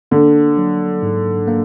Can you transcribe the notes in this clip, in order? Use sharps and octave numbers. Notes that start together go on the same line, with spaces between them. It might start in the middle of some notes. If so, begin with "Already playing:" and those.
D3 A#3
F#3
G#2
A#3